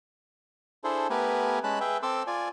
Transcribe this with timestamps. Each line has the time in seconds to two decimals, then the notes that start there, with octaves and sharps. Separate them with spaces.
0.84 D4 E4 G#4 A4 C5
1.10 A3 B3 G4 A#4 B4 G#5
1.64 G#3 C#4 A5 B5 F#6
1.81 G#4 B4 E5 G5
2.03 C4 A4 C6 D6 E6
2.27 F4 D5 G#5